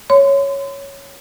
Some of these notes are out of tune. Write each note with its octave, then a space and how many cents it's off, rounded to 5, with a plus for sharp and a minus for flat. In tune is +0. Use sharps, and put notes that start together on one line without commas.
C#5 +0 C6 -40